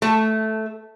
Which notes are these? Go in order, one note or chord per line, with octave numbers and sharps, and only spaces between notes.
A3